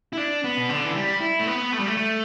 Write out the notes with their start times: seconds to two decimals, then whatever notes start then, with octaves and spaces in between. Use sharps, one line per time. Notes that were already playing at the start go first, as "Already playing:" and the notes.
0.13 E4
0.17 D4
0.44 B3
0.57 B2
0.70 D3
0.85 E3
0.95 G3
1.21 E4
1.39 A3
1.47 B3
1.73 A3
1.79 G3
1.87 A3
1.97 A3